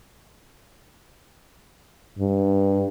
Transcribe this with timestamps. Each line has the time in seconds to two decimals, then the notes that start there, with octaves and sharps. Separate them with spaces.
2.19 G2